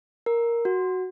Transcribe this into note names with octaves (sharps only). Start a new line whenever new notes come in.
A#4
F#4